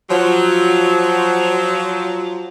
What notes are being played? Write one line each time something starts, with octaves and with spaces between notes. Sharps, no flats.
F3 F#3